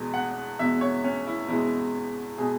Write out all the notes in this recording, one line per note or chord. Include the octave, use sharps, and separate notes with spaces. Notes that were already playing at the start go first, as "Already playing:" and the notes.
Already playing: E2 B2 G#3
F#5
E2 B2 G#3 E5
C#5
C#4
E4
E2 B2 G#3 E4
B2 G#3 G#4